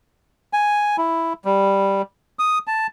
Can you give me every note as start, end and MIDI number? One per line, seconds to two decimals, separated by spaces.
0.53 0.96 80
0.98 1.33 64
1.45 2.02 55
2.39 2.59 87
2.67 2.87 81